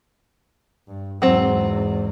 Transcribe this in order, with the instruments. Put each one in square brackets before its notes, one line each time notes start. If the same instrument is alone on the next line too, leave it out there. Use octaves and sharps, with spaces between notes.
[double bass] G2
[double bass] E2 G#2 [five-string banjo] F#3 C4